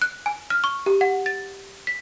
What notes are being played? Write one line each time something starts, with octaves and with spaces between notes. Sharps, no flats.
F#6
G#5
F6
C#6
G4
F#5
A6
B6